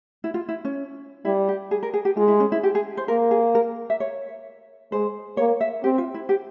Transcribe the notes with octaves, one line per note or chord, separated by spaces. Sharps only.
E4
F4
E4
C#4
G3 E4
G4
G#4
A#4
G#4
G4
G#3 F4
E4
C#4
E4
G4
G#4
C5
A#3 A#4
G#4
A#4
E5
C#5
G#3 C5
A#3 C#5
E5
C4 G4
F4
E4
G4